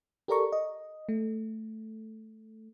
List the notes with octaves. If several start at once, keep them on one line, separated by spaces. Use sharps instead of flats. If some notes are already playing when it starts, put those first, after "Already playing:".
G4 A4 A#4 D5 A#5 C#6
D#5
A3